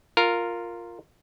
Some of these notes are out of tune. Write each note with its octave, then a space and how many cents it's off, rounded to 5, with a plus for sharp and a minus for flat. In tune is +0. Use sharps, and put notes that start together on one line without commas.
F4 +5 A#4 -5